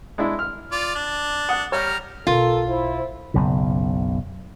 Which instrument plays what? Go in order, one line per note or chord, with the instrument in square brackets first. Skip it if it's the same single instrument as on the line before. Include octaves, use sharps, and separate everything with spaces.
[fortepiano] G#3 D4 E4
F6
[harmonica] F4 D5
D4
[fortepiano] F#5 D#6
[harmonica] G3 A#5 F6 [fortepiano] C#5
[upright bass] B1 D#4 [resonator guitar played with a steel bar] F4 [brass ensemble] A4 A#4
[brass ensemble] E4 C5
[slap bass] F#1 B1 C#3